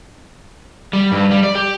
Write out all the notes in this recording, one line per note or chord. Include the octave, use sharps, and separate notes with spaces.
G3
G2
G3
D5
G4